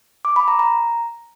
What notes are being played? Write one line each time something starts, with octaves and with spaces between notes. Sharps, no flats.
D6
B5
A#5
A#5